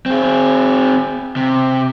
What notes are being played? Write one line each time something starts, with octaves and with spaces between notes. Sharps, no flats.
C4 G#4
C3